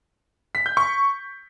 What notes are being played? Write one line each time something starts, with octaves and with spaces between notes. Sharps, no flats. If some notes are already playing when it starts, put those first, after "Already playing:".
B6
G6
C#6